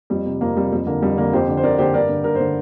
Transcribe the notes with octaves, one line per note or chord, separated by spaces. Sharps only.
F2 G3
C3
F2 A#3
C3 G3
F2 G3
D3 A#3
F2 G3
D3 A#3
F2 G4 C5
D3
C5
F2 A#4 D5
D3 G4 C5
G2 A#4 D5
D3
G2 A#4
D3 C5